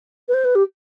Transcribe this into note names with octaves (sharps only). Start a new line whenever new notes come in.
B4
C5
B4
G4